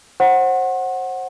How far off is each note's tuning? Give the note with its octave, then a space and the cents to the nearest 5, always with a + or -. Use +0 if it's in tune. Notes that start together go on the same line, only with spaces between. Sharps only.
C5 +30 F#5 +0 C6 +45